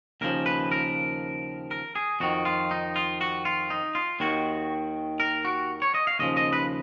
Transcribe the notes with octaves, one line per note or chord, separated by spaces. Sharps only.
D#2 C#3 F3 A#4
B4
A#4
A#4
G#4
F2 D#3 F#4
F4
D#4
F4
F#4
F4
D#4
F4
D#2 D#3 F#4
A#4
F#4
C#5
D#5
F5
D#2 C#3 F3 D#5
D#5
B4